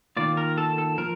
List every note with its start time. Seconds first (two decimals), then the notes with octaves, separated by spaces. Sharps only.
0.17 D#3 A#3 F4 D5
0.37 A#4
0.58 A4
0.78 A4
0.98 F3 A#4